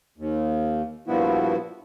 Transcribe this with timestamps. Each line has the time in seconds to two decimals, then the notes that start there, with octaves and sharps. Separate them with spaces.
0.18 D#2
1.07 G2 A#2 F3 B3 E4 F#4